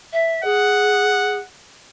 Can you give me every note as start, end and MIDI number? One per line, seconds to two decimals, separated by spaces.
0.12 0.41 76
0.44 1.37 68
0.44 1.46 78